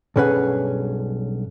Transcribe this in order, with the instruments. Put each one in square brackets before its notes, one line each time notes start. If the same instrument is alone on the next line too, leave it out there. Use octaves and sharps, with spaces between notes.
[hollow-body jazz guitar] B1 G2 C#4 G#4 B4 F#5